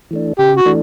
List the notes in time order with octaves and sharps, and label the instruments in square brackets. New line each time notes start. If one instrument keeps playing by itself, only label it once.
[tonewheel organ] E3 A3 D4
[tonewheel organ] C#3 [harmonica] G4
[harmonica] F#4
[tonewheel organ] E3 A3 D4